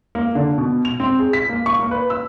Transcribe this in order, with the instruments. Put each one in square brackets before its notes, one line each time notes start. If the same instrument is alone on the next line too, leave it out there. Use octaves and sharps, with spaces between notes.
[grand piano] A#3
D3
B2
F7
C4
G#4
B6
A#3
C#6
A#3
B4
E6